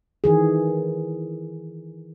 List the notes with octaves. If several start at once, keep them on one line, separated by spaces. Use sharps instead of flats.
D#3 E3 G#4